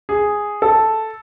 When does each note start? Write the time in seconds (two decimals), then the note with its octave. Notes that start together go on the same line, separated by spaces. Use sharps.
0.09 G#4
0.62 A4